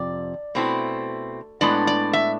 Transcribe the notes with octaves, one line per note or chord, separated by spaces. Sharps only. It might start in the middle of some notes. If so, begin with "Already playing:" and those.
Already playing: F2 C3 D5
B2 A3 C4 E4
A2 G#3 B3 D4 D5
D5
E5